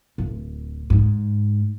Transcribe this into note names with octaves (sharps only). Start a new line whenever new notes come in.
D1
G#2